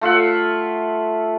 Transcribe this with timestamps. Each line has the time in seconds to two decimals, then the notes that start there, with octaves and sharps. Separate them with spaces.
0.01 A3 F4 E5 F#5